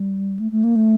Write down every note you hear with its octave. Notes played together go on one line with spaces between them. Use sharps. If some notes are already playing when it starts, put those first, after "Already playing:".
Already playing: G3
A3
A3
A#3
A3